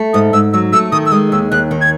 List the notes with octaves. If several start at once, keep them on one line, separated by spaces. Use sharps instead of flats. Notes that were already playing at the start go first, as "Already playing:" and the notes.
Already playing: A3
G#2 D#6
G#2 E6
F#3 E6
A3 E6
D#3 D#6
E6
G#3 D#6
D#2 E6
D#2 F#6
D#3
G#6